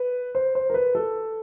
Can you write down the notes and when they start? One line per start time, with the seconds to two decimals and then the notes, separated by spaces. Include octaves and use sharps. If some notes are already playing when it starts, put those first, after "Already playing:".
Already playing: B4
0.35 C5
0.55 C5
0.70 A#4
0.74 B4
0.95 A4